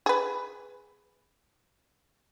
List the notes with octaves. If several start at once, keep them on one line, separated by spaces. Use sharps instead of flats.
G#4 B4